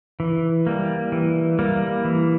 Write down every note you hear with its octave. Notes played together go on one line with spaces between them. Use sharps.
E3
G3 A#3
E3
G3 A#3
E3